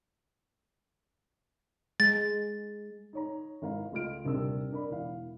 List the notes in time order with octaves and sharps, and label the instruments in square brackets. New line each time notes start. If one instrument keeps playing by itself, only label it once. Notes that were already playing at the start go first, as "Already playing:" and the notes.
[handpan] G#3 [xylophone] A6
[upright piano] D#4 C#5 A#5
G#1 E4 F5 A#5
C#2 A3 F4 D#5 F6 D7
D#1 C3 D4 A#4 E6
D4 A#4 D5 B5
E1 E4 F5